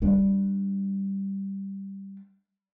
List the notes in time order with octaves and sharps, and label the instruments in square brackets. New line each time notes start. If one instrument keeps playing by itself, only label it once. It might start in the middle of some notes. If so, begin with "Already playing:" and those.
[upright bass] G3 D4